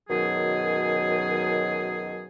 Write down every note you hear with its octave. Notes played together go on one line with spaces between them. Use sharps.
F#2 B2 D#3 F#3 G#4